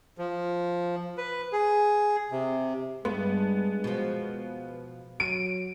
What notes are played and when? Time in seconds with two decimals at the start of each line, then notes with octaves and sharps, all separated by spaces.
0.18 F3
1.17 B4
1.52 G#4
2.31 C3
3.05 G2 G#3 B3
3.84 B2 F3
5.20 F#3 D7 D#7